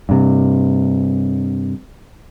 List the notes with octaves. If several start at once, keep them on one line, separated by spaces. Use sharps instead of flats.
G2 C3